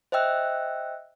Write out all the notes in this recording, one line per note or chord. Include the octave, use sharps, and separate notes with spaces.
C5 D#5 E5 G5 E6 F#6